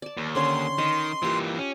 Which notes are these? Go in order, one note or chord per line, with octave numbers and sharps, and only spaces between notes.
D5 A5
D#2
D3 C#4 C#5 C6
D#3 D#5
E3 A#3 F4 G4
C#4